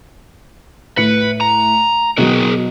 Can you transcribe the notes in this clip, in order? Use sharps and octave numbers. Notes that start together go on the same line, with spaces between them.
A2 B4 C#7
A#5
B2 F#3 F#4 G#4 A#4